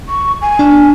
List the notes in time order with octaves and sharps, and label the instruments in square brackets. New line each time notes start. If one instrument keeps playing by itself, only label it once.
[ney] C#6
G#5
[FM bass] D4